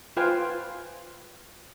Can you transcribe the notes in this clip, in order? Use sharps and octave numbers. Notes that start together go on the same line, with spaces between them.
F4 B4 C5 F5 G5 G#5